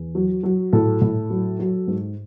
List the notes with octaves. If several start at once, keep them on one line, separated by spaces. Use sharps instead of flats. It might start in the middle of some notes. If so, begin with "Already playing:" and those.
Already playing: E2
F#3
F#3
A2 A4
A2
F#3
F#3
G#2